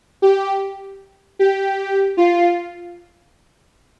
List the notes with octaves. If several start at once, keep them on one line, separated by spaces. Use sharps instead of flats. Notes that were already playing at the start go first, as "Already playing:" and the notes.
G4
G4
F4